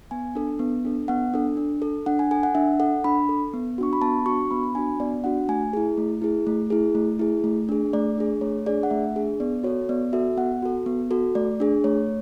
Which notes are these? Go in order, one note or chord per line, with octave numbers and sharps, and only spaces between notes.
B3 G#5
D4 A4
B3
D4 A4
B3 F#5
D4 A4
D4
A4
D4 F#5
G#5
A4 G#5
F#5
D4 E5
A4 F#5
D4 B5
A4
B3
D4 F#4 C#6
B5
B3 A5
D4 F#4 C#6
B3 B5
B5
D4 F#4 G#5
B3 D5
D4 F#4 F#5
A3 G#5
E4 G#4
A3
E4 G#4
A3
E4 G#4
A3
E4 G#4
A3
D4 G#4
A3 D5
D4 G#4
A3 C#5
D4 G#4 D5
F#5
A3 E5
D4 G#4
B3 D5
F#4 A4 C#5
B3 D5
F#4 A4 E5
B3 F#5
F#4 A4
B3
F#4 A4
A3 D5
D4 G#4
A3 C#5